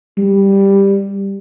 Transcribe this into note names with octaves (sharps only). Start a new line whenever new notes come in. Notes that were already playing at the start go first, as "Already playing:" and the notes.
G3